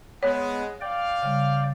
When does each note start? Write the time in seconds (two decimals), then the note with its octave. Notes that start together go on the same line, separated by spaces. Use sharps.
0.23 G#3 B3 C#5
0.81 D5 F5 G5
1.23 C#3 G3